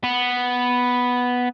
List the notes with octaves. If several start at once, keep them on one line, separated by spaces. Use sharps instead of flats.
B3